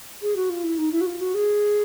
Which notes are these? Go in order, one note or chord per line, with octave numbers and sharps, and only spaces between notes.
G#4
F#4
F4
E4
D#4
E4
F#4
F4
F#4
G#4